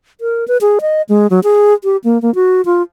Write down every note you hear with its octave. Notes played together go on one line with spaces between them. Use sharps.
A#4
B4
G#4
D#5
G#3
F#3
G#4
G4
A#3
A#3
F#4
F4